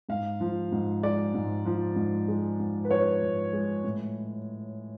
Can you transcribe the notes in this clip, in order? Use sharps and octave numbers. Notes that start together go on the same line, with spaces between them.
G#2 F5
F3
G#2
G#3 D5
G#2
F3
G#2
G#3
G#2
B4
F3 C#5
G#2
G#3
A2